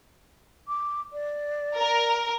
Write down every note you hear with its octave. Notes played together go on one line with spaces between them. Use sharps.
D6
D5
A#4